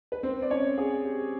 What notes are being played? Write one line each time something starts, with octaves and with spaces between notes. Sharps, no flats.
B4
C4 C5
D5
C#4 C#5
G#4
G4